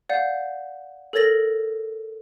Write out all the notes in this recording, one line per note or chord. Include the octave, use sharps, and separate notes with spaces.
D5 F5 F#5 G6
A4 A#4 C#5 A6 A#6 F#7